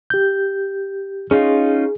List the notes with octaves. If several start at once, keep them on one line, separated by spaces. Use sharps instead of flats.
G4 G6
C#4 D#4 F4 G#4